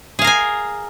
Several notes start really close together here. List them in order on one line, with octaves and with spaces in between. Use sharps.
G#4 F5 A#4 G#5